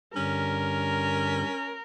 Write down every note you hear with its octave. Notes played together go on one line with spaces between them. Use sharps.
G2 D3 G3 C#4 A#4